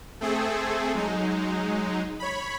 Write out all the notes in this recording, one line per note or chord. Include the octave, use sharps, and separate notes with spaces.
A3 C4 G#4 A4
F#3 G#3 D#4
C#5 B5